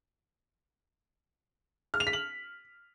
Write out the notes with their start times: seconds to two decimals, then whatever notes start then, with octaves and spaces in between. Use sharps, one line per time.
1.94 F6
2.00 F7
2.07 B6
2.13 F#7